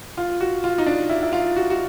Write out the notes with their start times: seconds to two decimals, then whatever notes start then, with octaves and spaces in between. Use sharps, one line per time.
0.17 F4
0.41 F#4
0.64 F4
0.78 D#4
0.86 D4
1.09 E4
1.23 E4
1.33 F4
1.56 F#4
1.70 F#4